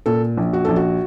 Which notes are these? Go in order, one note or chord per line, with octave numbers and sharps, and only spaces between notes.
A#2 A4
A#1
F#4
A#1 A4
F#4